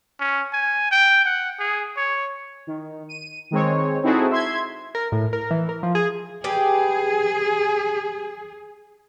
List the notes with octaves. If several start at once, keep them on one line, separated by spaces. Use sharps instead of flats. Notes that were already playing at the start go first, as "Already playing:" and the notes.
C#4
G#5
G5
F#5
G#4
C#5
D#3
D#7
D#3 G#3 C4 C#5
C4 D#4 E4 F#4 G#4 A4
E5 C6 G#6
A#4
A2
A#4
E3
A#4
F3
G#4
G4 G#4 B4